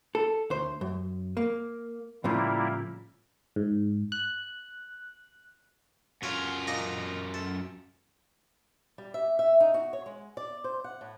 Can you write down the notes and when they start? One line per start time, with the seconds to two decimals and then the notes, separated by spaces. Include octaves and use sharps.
0.15 A4
0.50 D2 C5
0.81 F#2
1.37 A#3
2.24 A2 C#3 F3 G3 A#3 E4
3.56 G#2
4.12 F#6
6.23 F#2 F4 C#5
6.67 A#2 D#5 A#5
7.34 A4
8.98 G3
9.14 E5
9.39 E5
9.60 D#4
9.74 F#4
9.93 C#5
10.06 G#3
10.37 D5
10.64 C5
10.84 F#5
11.01 A2